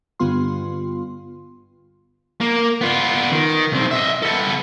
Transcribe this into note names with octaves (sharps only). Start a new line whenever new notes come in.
G2 D3 G3 B3 F4 C6
A#3
B3 F4
D#3
B1 C4
D#5 E5
B3 A4